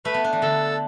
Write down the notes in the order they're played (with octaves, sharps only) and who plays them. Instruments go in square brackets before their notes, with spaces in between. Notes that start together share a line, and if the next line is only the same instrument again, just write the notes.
[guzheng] A3 [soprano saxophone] B4
[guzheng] B3
D4
E3
[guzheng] D3 [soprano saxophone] A4